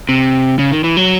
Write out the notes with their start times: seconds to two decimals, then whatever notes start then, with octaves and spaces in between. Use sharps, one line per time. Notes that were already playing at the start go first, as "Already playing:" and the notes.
0.09 C3
0.59 C#3
0.72 D#3
0.84 E3
0.97 F#3